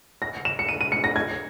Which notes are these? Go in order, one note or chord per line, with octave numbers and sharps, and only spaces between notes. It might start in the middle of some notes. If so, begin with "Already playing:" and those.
A#6
E7
C#7
D#7
D#7
C#7
A#6
G#6